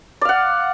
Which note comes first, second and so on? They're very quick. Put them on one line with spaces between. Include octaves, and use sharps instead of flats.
D5 F5 F#5